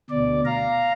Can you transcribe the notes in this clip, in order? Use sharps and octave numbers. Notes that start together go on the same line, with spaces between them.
D2 B2 D5
F5 A#5